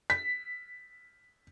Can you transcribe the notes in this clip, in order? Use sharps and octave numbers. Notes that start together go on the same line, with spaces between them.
B6